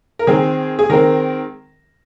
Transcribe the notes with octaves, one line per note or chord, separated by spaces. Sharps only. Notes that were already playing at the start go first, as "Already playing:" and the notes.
A#4
D#3 G#3 C4 G#4
G#4
D#3 G#3 C4 A#4